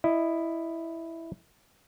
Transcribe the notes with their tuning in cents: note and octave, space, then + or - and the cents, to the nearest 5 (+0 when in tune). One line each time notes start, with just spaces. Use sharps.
E4 +0 D#5 -15